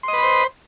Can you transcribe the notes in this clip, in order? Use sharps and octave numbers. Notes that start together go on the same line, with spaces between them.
B4 C5 D#5 B5 C6